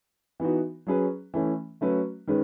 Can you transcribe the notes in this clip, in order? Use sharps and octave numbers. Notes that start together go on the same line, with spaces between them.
E3 B3 D#4 F#4
F#3 C#4 G#4 B4
E3 A3 C#4
F#3 A3 C#4 F#4 B4
D#3 G#3 C#4 B4